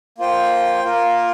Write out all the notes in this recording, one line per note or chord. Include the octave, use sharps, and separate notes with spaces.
A#3 F4 C5 G5
A#3 F4 A#4